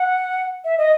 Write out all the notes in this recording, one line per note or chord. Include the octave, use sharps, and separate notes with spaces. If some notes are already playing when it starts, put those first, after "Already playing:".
Already playing: F#5
E5
D#5